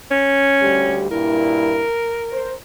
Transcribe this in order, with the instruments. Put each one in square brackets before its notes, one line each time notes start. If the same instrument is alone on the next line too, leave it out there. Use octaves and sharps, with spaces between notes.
[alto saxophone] C#4
[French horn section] D2 G3 G4
[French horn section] G2 A#2 E4 [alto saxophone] A#4
[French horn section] C5